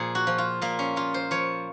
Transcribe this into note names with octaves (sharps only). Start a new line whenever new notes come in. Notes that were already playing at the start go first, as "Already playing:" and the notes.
Already playing: A#2 F3 G#4
F#4
F3
F4
A#2 A#3
C#4
A#2 F4
C5
F3 C#5